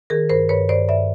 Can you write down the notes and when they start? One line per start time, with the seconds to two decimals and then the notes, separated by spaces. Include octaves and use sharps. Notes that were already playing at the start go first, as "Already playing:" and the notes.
0.10 D#3 G#4 A#4
0.29 G2 A#4 C5
0.49 G2 B4 C#5
0.69 G2 C5 D5
0.88 G2 D5 E5